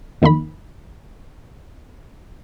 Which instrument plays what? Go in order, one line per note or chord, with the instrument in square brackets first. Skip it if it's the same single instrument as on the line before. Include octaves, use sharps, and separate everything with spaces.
[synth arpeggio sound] F2 D#3 A#3 D#4 B5